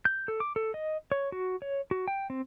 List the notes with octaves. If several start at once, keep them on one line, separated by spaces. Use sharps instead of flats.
G6
A4
D6
A4
D#5
C#5
F#4
C#5
F#4
G5
C4